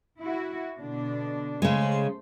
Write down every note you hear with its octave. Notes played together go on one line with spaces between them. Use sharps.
E4 F#4
B2 D3 D4
C#3 G#3 A3 C5